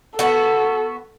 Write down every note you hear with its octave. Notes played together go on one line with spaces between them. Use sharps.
B3 F#4 A4